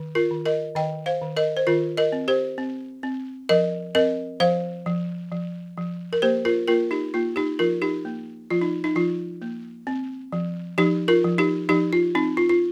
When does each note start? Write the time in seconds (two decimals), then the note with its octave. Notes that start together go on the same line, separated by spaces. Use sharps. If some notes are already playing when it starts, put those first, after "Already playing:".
Already playing: D#3
0.15 F4 A#4
0.31 D#3
0.46 A#4 D#5
0.75 D#3 D#5 G5
1.06 C5 F5
1.22 D#3
1.37 A#4 D#5
1.57 C5
1.67 D#3 F4 A#4
1.97 A#4 D#5
2.12 C4
2.28 G4 C5
2.58 C4
3.03 C4
3.49 F3 A#4 D#5
3.95 C4 A#4 D#5
4.40 F3 C5 F5
4.86 F3
5.32 F3
5.77 F3
6.13 A#4
6.22 A#3 G4 C5
6.45 F4 A#4
6.68 A#3 F4 A#4
6.91 D#4 G4
7.14 A#3 F4
7.36 D#4 G4
7.59 F3 F4 A#4
7.82 D#4 G4
8.05 A#3
8.50 F3 F4
8.61 D#4
8.84 D#4
8.95 F3 F4
9.42 A#3
9.87 C4
10.32 F3
10.78 F3 D#4 G4
11.08 F4 A#4
11.24 F3
11.38 D#4 G4
11.69 F3 D#4 G4
11.93 F4
12.15 C4 D#4
12.37 F4
12.49 F4